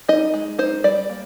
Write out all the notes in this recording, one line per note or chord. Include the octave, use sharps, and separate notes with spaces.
D#4 D#5
G#3
D#4 C5
G3 D5
A#3